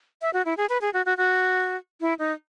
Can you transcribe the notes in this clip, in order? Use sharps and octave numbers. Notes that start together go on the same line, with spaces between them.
E5
F#4
E4
G#4
B4
G#4
F#4
F#4
F#4
E4
D#4